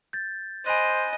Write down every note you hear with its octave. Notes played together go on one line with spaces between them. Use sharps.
G6 A6
C5 D#5 G#5 B5 F#6